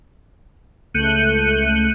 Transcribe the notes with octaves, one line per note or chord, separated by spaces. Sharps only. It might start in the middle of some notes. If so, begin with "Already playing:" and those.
C#2 A3 F#6 G6 C#7 D#7